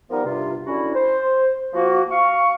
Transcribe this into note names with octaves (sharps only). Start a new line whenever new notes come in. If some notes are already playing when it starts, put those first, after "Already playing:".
F3 G3 B3 D#4 A#4
G2 C3 F4
F#2 D3 C#4 E4 F#4 B5
C5
F3 A#3 F#4
F5 C#6